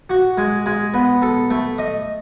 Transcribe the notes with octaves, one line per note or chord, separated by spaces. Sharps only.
F#4
G#3
G#3
B3
A4
A3
D#5